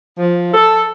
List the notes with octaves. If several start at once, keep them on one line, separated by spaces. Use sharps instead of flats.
F3
A4